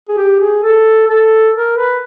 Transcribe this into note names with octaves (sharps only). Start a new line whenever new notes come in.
G#4
G4
G#4
A4
A4
A#4
B4